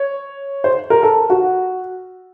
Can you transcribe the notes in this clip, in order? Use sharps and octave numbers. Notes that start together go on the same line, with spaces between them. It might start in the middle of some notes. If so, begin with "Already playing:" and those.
Already playing: C#5
C5
A#4
A4
F#4